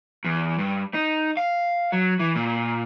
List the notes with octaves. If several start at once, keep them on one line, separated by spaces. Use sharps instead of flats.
E2
G2
D#4
F5
F#3
E3
A#2